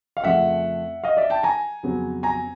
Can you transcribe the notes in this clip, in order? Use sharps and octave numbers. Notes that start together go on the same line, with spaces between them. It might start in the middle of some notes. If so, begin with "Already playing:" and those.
F5
F2 C#3 F3 A3 E5 F#5
D#5 F5
D5 E5
G5 A5
G#5 A#5
F2 C#3 F#3 B3
G#5 A#5